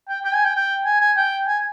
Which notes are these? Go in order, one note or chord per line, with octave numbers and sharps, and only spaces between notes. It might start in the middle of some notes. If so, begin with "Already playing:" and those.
G5
G5
G#5
G5
G5
G#5
G#5
G5
G#5